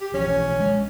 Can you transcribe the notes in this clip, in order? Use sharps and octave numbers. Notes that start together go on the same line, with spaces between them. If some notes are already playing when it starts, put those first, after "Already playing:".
G4
B1 E3 F3 C#4
G#3 D4